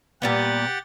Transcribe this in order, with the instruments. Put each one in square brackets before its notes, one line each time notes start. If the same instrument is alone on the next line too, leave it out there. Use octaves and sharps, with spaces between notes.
[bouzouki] A#2 G3 B3 [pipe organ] G4 F#5 A6